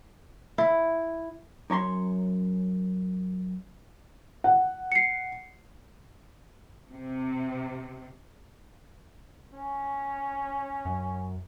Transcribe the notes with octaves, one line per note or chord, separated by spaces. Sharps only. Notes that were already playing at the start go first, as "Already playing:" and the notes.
E4
F#2 C#5 A#5 C6
F#5
C7 C#7
C3
C#4
F#2